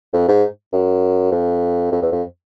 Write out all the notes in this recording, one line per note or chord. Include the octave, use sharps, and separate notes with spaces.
F2
G#2
F#2
F2
F2
E2
F2